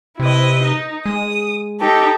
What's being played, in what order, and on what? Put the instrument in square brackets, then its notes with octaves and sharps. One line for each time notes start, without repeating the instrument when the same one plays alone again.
[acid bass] C3 [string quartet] E4 B4 D#5
[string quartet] D#4
[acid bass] G#3 [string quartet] D#6
[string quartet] D#4 G4 A4